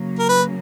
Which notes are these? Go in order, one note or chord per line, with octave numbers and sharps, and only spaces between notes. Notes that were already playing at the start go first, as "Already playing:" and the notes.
Already playing: C#3 F#3 A#3
A#4
B4